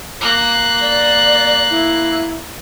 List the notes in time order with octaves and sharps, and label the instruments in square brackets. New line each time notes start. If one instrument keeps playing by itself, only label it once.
[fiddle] A#3 F#6
[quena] D5
E4